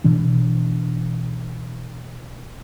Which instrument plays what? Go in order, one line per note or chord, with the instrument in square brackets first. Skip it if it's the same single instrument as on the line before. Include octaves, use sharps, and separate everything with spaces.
[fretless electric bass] B2 E3 D4